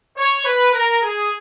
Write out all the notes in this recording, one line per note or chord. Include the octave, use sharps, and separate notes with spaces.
C#5
B4
A#4
G#4